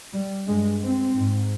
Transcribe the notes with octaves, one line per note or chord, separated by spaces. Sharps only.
G3
G2 G#3
C4
G#2